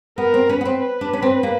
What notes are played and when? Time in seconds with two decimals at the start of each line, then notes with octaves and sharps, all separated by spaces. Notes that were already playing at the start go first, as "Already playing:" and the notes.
0.18 B3 A#4
0.34 C4
0.49 C#4 B4
0.61 B3
0.65 C4
0.80 B4
1.01 D4
1.13 C#4
1.22 C4
1.43 A#3